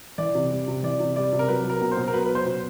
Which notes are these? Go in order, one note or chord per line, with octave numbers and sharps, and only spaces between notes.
E3 D5
C3
G3
C3
E3 D5
C3
G3 D5
C3
A#4
F#3 B4
F#3
A#4
B2
C5
B2
A#4
F#3 B4
F#3 B4
C5
B2